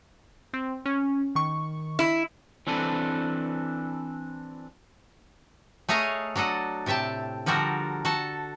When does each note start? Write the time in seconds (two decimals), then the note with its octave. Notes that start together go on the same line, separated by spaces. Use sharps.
0.53 C4
0.86 C#4
1.35 D#3 C#6
1.99 E4
2.67 E3 C4 D4 A4 B4
5.89 A3 G#4 C#5 D#5 F5 A#5
6.36 F#3 D4 A4 D#5 F#5
6.86 A2 C3 E5 G5 A5
7.46 D3 F3 G3 F#4 A4 A#4
8.05 F#4 A4 A5